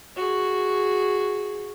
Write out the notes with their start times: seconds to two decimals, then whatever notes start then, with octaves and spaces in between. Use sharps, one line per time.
0.17 F#4 G#4